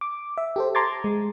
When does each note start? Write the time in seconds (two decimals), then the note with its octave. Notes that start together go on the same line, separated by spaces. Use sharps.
0.01 D6
0.38 E5
0.56 G4 A4 C5
0.75 A5 A#5 C6 D6 G#6 A6
1.04 G#3